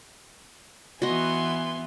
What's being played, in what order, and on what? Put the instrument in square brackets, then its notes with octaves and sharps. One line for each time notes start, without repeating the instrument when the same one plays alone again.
[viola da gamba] E3 B3 [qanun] F#4 D#5 [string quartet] G#5 C6